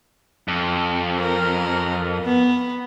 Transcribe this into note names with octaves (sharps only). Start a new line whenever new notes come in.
F2
A#4
B3